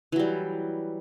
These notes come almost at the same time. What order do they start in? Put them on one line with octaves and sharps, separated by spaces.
E3 F#3 G3